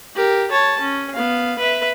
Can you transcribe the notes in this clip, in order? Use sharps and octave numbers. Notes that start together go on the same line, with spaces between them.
G4 A#4
C#5 A5
C#4
B3 F5
B4 E5